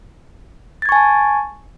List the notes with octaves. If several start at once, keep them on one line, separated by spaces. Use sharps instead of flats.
G#5 A5 C#6 G#6 A6